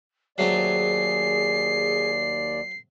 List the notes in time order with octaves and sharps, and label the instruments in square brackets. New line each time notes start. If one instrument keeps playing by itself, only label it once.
[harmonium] D#2 D5 [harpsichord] F#3 A3 C4 [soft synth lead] G#4 [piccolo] C7